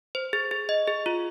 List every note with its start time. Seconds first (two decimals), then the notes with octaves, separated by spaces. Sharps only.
0.15 C5
0.33 G#4
0.51 G#4
0.69 D#5
0.87 G#4
1.06 F4